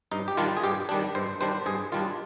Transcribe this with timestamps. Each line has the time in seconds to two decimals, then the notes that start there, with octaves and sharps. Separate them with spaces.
0.11 G2 D#4
0.28 G4
0.37 D#3 G3 D4 F4
0.57 G#4
0.64 G2 G4
0.89 D#3 G3 D4
1.15 G2 C5
1.41 D#3 G3 D4 C5
1.66 G2 G#4
1.92 D#3 G3 D4 F4